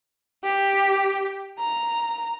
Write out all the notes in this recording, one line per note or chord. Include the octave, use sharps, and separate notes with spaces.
G4
A#5